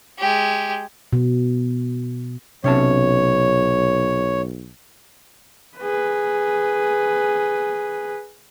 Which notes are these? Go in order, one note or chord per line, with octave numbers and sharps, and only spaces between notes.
G#3 G4
B2
B1 C3 C#4 C#5 A5
G#4 B4